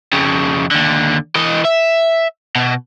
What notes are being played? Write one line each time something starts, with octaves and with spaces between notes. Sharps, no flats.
F2 C#3
D#2 D3
E3 D#5
E5
B2